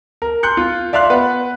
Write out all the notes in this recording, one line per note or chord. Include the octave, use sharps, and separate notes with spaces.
A#4
C6 F#6 G6 C#7
F4
D5 E5 F5 C6 F#6
B3 B4 F#5